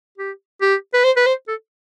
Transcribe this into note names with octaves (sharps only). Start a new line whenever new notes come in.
G4
G4
B4
C5
B4
C5
A4